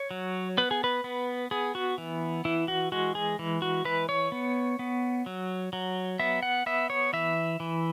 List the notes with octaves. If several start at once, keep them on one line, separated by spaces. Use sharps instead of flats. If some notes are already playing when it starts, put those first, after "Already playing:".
Already playing: C#5
F#3
B3 B4
G#4
B4
B3
B3 G#4
F#4
E3
E3 E4
F#4
G#3 F#4
G#4
E3
F#4
E3 B4
C#5
B3
B3
F#3
F#3
B3 E5
F#5
B3 E5
C#5
E3 E5
E3